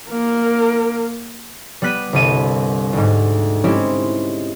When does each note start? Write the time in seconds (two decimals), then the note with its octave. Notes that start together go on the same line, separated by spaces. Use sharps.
0.10 A#3 A#4
1.82 G3 B3 F#6 B6 D#7
2.13 G1 C2 D#7
2.93 D2 G#2
3.64 G#3 C4 C#4 E4 G4